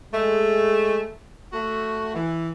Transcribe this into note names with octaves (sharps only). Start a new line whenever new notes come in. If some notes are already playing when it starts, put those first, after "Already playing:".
G#3 A3
A3 F#4
E3